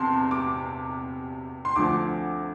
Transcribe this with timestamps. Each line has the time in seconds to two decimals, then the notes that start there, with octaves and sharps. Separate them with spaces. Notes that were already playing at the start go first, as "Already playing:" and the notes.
Already playing: E2 C3 A5 C6
0.31 D6
1.65 C6
1.76 D2 D3 F3 D6